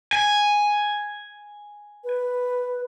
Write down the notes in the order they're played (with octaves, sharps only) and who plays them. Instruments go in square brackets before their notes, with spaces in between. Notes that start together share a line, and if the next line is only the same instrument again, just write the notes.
[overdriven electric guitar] G#5
[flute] B4